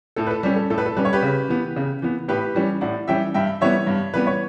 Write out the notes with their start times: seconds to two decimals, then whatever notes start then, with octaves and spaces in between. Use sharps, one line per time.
0.16 A2 A4
0.27 B4
0.31 A4
0.43 G3 C#4 G4
0.56 A4
0.70 A2 A4
0.78 B4
0.86 A4
0.96 G3 C#4 B4
1.05 C#5
1.13 G4 B4
1.23 C#3
1.49 E3 B3
1.76 C#3
2.02 E3 B3
2.28 A2 G4 B4
2.55 E3 G3 C#4
2.81 A2 D5 F#5
3.08 E3 G3 C#4 E5 G5
3.34 G2 E5 G5
3.61 E3 G3 B3 C#5 E5
3.87 G2
4.14 E3 G3 B3 B4
4.27 C#5